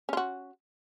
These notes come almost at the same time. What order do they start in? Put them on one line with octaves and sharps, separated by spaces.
C#4 F4 F#4